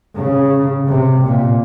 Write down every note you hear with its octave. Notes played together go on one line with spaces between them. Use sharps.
C#3
C3
A#2